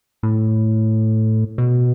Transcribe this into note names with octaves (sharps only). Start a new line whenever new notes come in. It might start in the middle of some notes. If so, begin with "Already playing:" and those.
A2
B2